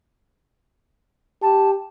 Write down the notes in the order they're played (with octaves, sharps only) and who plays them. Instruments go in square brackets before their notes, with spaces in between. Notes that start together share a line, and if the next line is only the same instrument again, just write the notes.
[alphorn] G4 [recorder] A5